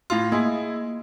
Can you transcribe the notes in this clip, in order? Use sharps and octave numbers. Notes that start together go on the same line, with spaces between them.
A2 F4 C6
A#3 E4 G#4